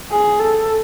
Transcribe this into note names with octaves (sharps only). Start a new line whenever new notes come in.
G#4
A4